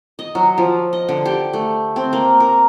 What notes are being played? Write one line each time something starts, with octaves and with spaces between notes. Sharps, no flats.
D#5
F#3
F3
D#5
D3
G4
A3
C4
A#3
A#4